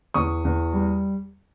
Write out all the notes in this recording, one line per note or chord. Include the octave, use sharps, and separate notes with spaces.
E2 C#6 D#6
E2
G3